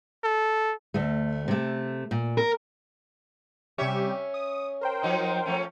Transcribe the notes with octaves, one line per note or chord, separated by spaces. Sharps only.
A4
D2 A3
C3 A3
A#2
A#4
C3 G3 C#4 G4 C#5 E5
D#6
A#4 C5 G5
F3 F#3 D#4
F3 A3 C#4